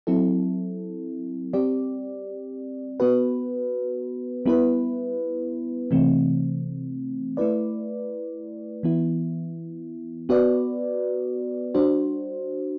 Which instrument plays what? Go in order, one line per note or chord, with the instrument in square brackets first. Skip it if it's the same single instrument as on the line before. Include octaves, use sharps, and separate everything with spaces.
[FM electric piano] F#3 C4 E4 A4
G3 C4 G4 D5
B3 F#4 B4
G3 B3 E4 B4
C3 E3 A3 C4
A3 E4 B4 D5
E3 B3 E4
B3 F#4 B4 D5
G3 D4 F#4 C5